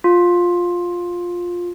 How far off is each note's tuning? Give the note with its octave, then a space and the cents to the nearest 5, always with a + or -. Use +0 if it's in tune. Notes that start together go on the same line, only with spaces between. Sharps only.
F4 +10